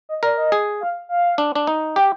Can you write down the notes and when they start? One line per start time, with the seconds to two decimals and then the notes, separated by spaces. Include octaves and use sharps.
0.09 D#5
0.23 A#4 D5
0.37 D#5
0.52 G#4
0.81 F5
1.09 F5
1.38 D4
1.55 D4
1.67 D#4
1.96 G4 G5